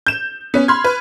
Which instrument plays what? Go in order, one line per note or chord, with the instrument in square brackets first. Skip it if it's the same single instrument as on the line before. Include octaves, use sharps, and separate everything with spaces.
[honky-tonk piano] G6 E7
B3 C#4
B5 C6 F6 G#6
B4